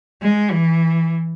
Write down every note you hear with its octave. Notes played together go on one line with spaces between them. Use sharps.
G#3
E3